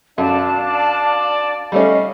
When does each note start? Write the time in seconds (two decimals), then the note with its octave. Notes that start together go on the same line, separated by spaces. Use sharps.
0.18 F#2 D4 D5 F5 A5
0.60 D5
1.72 G3 A3 C#4 D#5 F5